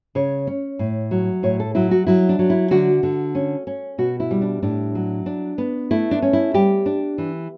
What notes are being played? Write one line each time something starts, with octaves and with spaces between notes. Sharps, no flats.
C#3 C#5
C#4
A2
F#3
A2 C#5
A4
F#3 E4
F#4
F#3 E4
D4
F#3
E4
D3 F#4
D3
C#4
C#4
B2 F#4
E4
G3
D4
A2 D4
F#3
D4
B3
A3 E4
D4
C#4
E4
G3 G4
D4
E3